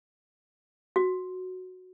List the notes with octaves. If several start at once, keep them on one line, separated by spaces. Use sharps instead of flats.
F#4